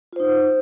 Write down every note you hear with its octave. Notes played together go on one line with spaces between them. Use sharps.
D#4 F4 C5